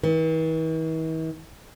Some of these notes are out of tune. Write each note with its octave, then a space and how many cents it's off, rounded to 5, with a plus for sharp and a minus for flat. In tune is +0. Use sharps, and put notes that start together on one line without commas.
E3 -45